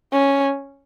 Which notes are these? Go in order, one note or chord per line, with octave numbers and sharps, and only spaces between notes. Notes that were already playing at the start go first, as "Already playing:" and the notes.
C#4